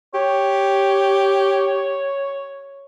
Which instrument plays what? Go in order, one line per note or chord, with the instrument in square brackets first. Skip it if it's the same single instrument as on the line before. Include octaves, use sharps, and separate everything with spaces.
[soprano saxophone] G4 [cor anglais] C#5